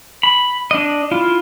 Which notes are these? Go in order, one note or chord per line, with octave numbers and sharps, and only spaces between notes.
B5
D4 D#5
E4 F4